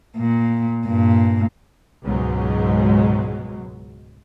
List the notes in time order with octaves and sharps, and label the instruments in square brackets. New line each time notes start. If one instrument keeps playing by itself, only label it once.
[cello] A#2
G2 A#2
[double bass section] C#2 G#2 B2 F#3 G#3